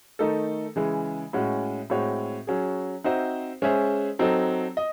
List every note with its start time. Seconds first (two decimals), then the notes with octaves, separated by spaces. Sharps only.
0.19 D#3 A3 D#4 A4
0.76 C#3 E3 G#3
1.33 A2 G#3 C#4 F#4
1.90 A2 G#3 C4 F#4 C#5
2.47 F#3 C#4 G#4
3.04 C4 D#4 F#4 C5 E5
3.62 G#3 C#4 G#4 C5 E5
4.19 F#3 C4 D#4 A4
4.77 D#5